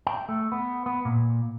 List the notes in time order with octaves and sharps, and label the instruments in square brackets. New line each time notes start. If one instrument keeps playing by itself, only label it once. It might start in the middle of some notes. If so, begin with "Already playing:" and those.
[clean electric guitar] G5
A3
B3
B3
A#2